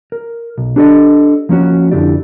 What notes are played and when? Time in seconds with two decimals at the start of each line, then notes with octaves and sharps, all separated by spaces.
0.12 A#4
0.58 B1
0.76 D4 G4 A4 B4 D5 D#5
1.49 F3 A#3 C#4 F#4
1.91 F2 D3 E4 G4 D5